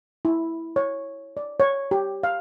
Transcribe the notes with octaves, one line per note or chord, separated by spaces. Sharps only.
E4
C#5
D5
C#5
G4
F5